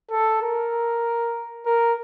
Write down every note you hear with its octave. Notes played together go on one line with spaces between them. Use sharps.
A4
A#4
A#4